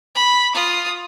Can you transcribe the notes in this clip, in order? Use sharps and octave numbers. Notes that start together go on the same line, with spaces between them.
B5
F4 D#6